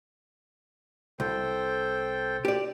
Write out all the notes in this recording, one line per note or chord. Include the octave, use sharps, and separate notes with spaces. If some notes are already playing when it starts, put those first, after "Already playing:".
C2 A4 C5 G5
G4 D5